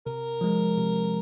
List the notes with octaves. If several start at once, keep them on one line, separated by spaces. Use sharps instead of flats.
C3 A#4
F3 G#3
C3